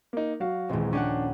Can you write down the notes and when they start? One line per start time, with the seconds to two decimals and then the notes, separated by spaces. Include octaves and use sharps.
0.13 A#3 D#4
0.40 F#3 F#4 F5
0.69 D#1 A#1 E3 G#3 C4
0.93 C#4 D4 G4 F#5